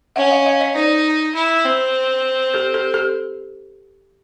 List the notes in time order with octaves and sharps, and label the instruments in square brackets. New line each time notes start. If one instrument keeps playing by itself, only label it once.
[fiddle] C#4 [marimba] E5 F#5
[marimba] D#5 F5
D#5 F5
C#5 D#5
[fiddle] D#4 [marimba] C5 D5
[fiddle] E4
C4
[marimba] G4 A4
G4 A4
G4 A4